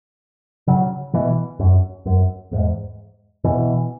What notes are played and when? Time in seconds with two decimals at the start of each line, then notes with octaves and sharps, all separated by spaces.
0.67 C#3 F#3
1.13 B2 E3
1.59 F#2
2.05 F#2
2.51 E2 G#2
3.44 B2 E3